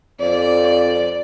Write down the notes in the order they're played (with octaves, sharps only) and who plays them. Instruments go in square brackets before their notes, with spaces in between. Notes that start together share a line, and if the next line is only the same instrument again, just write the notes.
[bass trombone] F2 [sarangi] D5